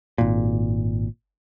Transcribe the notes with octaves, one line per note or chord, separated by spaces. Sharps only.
G#1 A#2